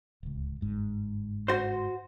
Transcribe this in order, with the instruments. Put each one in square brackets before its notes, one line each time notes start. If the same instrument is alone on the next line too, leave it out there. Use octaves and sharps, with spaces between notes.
[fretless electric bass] D1 C#2
G1 G#2
[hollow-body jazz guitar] F#4 C5